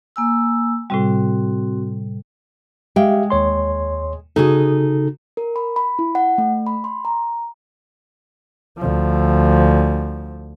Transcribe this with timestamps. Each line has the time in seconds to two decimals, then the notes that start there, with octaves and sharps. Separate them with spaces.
0.16 A#3 G#5 E6
0.90 A2 C3 G3 C4 F#4
2.96 G#3 G4 E5 F5 G5
3.30 D#2 C#5 C6
4.36 C#3 D#4 F#4 G#4 A4
5.37 A#4
5.56 B5
5.76 B5
5.99 E4
6.15 F#5
6.38 A3
6.67 B5
6.84 C6
7.05 A#5
8.78 D2 F3